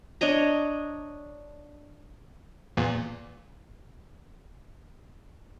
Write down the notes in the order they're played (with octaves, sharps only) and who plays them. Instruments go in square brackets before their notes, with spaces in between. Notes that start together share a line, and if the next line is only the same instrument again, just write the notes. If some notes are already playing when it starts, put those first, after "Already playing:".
[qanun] D4 C#5 D#5 A#5
[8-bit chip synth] E2 A#2